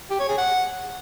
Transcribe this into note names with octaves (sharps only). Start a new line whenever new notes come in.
G4
C#5
G#4
F#5